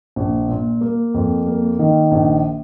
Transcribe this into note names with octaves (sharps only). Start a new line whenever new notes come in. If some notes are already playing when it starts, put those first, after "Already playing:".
A#1
A#2
A#3
F2
A#3
D#3
A#1